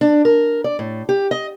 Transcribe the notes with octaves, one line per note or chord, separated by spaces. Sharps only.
D4
A#4
D5
A2
G4
D#5